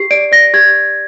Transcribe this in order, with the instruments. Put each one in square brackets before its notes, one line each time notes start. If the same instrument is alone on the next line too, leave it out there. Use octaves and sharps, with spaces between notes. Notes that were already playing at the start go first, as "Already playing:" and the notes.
Already playing: [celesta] G4 C7
D5 D7
D5 A#6
G4 G#6